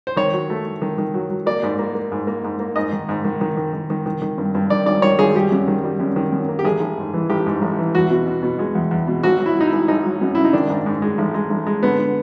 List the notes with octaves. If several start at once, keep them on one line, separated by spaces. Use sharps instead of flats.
C5
D#3 C#5
F#3
A3
A3
D#3
D#3
F#3
F#3
A#3 D5
G#2
A#3
A#3
G#2
A#3
G#2
A#3
G#2 D#5
D#3
G#2
D#3
D#3
D#3
D#3
D#3
D#3
D#3
G2
G2
D#3 D5
G#1 D5
D#3 C#5
G#1 G#4
G3 G4
F#2
D#3
G3
F#2
D#3
F#2
A#3
G4
A1 G#4
A1
G#2
E3
A1 G4
G#2
A1
E3
E2 F#4
B2
B2
B2
G#3
E2
E2
B2
G#1 F#4
F#3
E4
F#3 D#4
E4
G#1
G#1 D#4
F#3
F#2
C#3 E4
D#4
D#3 D4
G#2
G#2
G#3
A1
G#3
A1
G#3
D3 B3
D3